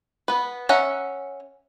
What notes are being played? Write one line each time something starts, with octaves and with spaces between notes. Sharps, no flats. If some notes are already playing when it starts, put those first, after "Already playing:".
B3 B4
C#4 E5 F#5 A#5